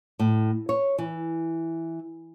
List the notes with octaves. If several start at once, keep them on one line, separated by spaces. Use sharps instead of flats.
A2
C#5
E3